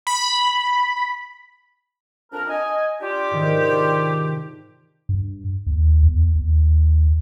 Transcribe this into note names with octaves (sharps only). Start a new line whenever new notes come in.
B5
F2 D4 A#4
D#5 G#5
D4 F4 G4
G#2 C3 D#3
G2
D#2
E2
D#2